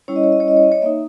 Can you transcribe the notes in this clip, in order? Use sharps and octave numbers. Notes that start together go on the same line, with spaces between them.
G3 C#4 E4 C#5
D#5
C#5
D#5
C#5
D#5
C#5
D#5
C#5
A#3 D#4 E5